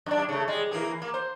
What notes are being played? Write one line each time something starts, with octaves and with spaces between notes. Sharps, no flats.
F#2 D4
C#3 A3
G3 G#3
E3 A#3 G#4
A#3
C5